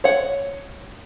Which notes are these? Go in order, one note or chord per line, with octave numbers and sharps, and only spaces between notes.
C#5 F#5